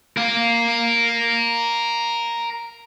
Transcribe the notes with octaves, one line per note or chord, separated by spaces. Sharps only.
A#4 F5